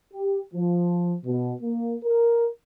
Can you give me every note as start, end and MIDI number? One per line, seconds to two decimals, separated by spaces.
0.14 0.41 67
0.54 1.16 53
1.26 1.53 47
1.62 1.95 58
2.05 2.47 70